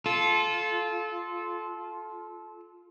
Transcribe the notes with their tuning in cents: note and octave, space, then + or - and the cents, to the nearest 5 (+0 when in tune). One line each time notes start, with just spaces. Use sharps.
F4 +0 A4 -25